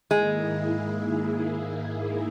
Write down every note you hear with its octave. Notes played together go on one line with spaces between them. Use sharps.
G#2 D#3 G#3 A#3 E4 G#4